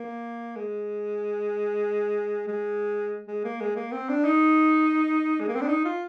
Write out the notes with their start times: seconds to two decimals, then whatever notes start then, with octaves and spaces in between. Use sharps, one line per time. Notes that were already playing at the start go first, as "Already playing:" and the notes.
Already playing: A#3
0.56 G#3
2.48 G#3
3.28 G#3
3.44 A#3
3.61 G#3
3.76 A#3
3.92 C4
4.09 D4
4.25 D#4
5.40 G#3
5.48 A#3
5.55 C4
5.61 D4
5.68 D#4
5.85 F4